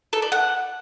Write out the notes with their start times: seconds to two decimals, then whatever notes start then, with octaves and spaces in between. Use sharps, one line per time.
0.13 A4
0.22 D5
0.32 F#5